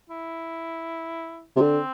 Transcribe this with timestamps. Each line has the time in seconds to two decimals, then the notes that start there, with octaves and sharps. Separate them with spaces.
0.10 E4
1.56 C3
1.60 D3 C4